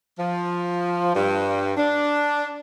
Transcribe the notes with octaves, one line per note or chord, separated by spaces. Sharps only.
F3
G2
D4